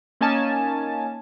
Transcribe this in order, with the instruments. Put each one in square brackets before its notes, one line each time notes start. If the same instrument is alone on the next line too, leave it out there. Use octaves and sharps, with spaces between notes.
[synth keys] A#3 C#4 D#4 G#5 A5